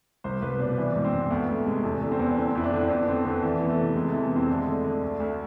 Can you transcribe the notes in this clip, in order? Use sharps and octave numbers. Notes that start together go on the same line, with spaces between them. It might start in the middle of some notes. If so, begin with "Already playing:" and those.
C2 C5
C2 B4
B2 D4
E3 D4
G#2
C4
G#2
D2 B3
D2 A3
C3 G#3
E2 A3
D3 A3
C4
E2 B3
D3 C4
F2 E4
D4
D3
C4
F2 B3
D3 C4
D3 B3
E3 A3
E3 B3
A3
C3
C3 G#3
E3 A3
B3
F2 C4
D3 A3
G#3
D3 A3
D3
D2
D2